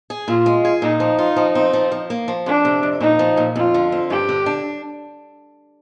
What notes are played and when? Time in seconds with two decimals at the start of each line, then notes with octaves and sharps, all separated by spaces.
0.10 G#4
0.28 A#2 F4
0.46 G#3
0.65 G#4
0.82 A#2 D#4
1.00 F3
1.19 F4
1.36 F3
1.55 C4
1.73 F3
1.92 F3
2.10 A#3
2.28 F3
2.46 F2 D4
2.65 C3
2.83 F2
3.00 A#2 D#4
3.19 F3
3.37 A#2
3.56 F2 F4
3.74 D3
3.92 C4
4.10 G2 G4
4.29 D3
4.46 D4